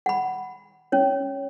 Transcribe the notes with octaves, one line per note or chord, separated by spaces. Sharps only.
F#5 B5
C#4 C#5